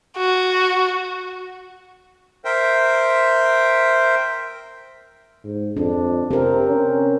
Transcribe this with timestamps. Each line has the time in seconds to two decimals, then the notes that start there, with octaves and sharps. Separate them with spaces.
0.18 F#4
2.45 A#4 C5 E5 G5
5.44 G#2
5.77 F2 D4
6.31 C3 C4 A#4
6.69 C#4